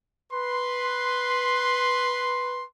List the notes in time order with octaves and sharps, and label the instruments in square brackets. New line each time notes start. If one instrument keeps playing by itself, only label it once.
[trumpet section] B4 C6